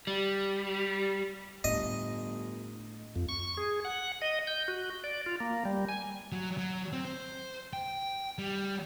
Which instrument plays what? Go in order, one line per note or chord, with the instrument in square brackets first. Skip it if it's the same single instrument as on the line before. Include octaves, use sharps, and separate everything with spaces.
[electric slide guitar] G3
[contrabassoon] G1 [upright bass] A2 [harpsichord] D#5
[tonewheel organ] F2
C#6
G#4
F#5
D#5
G6
F#4
D5
F4
A#3
G3
G#5
[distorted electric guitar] F#3
F#3
C4
C5
G5
G3